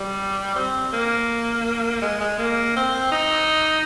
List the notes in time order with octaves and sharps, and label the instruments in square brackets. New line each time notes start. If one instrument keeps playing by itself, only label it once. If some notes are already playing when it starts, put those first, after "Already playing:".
Already playing: [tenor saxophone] G3
C4
A#3
G#3
G#3
A#3
C4
D#4